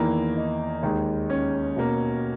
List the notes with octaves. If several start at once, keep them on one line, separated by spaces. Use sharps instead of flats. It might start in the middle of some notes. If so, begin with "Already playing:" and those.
Already playing: E2 D#3 E3 A#3 E4
D#4
D#2 D#3 G#3
C#4
B2 A#3